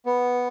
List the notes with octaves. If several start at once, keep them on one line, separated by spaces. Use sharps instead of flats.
B3